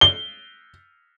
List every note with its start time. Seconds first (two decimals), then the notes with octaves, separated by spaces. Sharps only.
0.01 G7